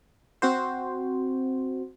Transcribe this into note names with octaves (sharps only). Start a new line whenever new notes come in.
C4 F#4 C5